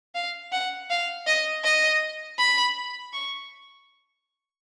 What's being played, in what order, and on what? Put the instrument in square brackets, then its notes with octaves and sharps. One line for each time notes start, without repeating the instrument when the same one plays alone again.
[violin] F5
F#5
F5
D#5
D#5
B5
C#6